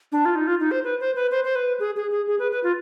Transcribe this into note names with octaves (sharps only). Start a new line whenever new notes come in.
D4
F4
D#4
F4
D#4
C5
B4
C5
B4
C5
C5
B4
G#4
G#4
G#4
G#4
B4
B4
F4